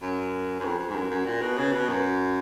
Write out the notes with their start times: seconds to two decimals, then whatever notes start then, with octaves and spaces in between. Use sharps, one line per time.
0.01 F#2
0.60 F#2
0.65 F2
0.79 F2
0.89 G#2
0.95 F#2
1.10 F#2
1.26 A#2
1.41 B2
1.58 C#3
1.72 B2
1.89 F#2